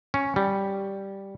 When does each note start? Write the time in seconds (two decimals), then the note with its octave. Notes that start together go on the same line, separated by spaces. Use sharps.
0.14 C#4
0.36 G3